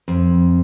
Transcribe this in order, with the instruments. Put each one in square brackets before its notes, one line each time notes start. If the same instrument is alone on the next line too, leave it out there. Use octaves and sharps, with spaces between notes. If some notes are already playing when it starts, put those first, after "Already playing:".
[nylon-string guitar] F2